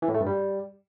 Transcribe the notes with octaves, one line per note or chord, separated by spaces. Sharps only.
E3
A2
A3
G2
G3